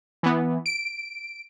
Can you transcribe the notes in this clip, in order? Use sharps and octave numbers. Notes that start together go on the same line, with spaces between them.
E3 B3
D7